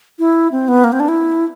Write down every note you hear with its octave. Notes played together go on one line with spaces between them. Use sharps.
E4
C4
B3
A#3
C4
D4
E4